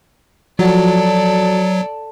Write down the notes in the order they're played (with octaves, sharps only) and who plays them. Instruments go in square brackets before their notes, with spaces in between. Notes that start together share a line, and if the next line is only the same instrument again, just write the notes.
[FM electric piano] F3 F#4 [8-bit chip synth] F#3 [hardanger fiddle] A4 D5